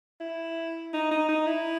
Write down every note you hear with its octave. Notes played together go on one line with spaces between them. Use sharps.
E4
D#4
D#4
D#4
E4